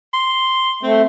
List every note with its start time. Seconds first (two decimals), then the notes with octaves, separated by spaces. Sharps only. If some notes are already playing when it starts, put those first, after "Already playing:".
0.13 C6
0.83 A3 C4